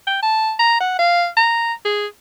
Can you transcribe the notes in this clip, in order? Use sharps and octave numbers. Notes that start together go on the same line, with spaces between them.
G5
A5
A#5
F#5
F5
A#5
G#4